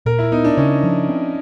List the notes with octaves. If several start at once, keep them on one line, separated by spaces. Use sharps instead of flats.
A#2 A#4
E4
B3 D#4
D4
C#3 C#4
F3
C4